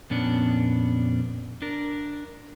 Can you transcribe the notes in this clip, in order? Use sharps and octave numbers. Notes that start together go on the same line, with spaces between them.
F2 A#2 B3 C#4 D4
D4 A#4